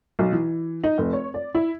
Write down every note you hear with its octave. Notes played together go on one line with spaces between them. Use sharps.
B1
E3
D#4
F1
C#5
D5
E4